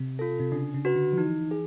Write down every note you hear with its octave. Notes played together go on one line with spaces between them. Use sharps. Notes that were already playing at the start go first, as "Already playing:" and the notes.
Already playing: C3
F4 A4
C3
C#3 D4
C#3
F#4 B4
D3
F3
E3 D#4
G#4